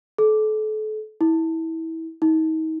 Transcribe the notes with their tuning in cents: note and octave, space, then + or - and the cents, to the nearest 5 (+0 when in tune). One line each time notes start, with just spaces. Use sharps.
A4 -35
E4 -25
D#4 +35